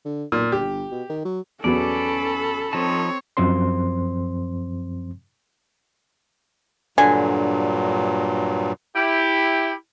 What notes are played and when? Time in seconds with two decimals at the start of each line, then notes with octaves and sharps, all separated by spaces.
0.05 D3
0.32 B1 A#2
0.52 G1 G4
0.92 B2
1.10 D#3
1.25 F#3
1.64 E2 F#3 B3 C#4 A4 D5 B5
2.73 F3 C4 D#4 C#5 A5
3.37 F#2 F3 C4 C5 C6
6.98 G2 A#2 D3 F#3 G#5
8.96 E4 G4